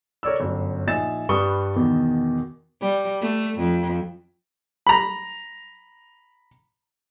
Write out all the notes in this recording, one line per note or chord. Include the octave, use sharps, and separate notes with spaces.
A#4 C#5 D5 E6
G1 F#2
A#1 D#4 E5 G#5 A6 E7
G2 G3 B4 C#6 D#6 G7
E2 B2 D#3
G3
A3
F2
A#5 B5